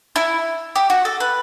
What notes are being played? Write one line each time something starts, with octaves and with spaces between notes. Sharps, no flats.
E4
G4
F#4
A4
B4